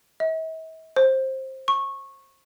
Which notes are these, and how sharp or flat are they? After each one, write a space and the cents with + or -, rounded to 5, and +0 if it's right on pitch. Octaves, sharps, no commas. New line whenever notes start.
E5 -45
C5 +15
C#6 -15